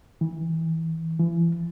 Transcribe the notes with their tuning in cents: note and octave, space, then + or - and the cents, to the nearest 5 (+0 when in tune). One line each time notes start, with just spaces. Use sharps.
E3 -25
E3 +35